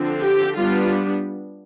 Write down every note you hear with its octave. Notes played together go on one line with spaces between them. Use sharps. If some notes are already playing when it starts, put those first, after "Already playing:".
Already playing: D3 F3 C4
G4
G3 B3 D4 F4